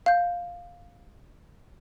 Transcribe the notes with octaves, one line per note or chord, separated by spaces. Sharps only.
F5 G6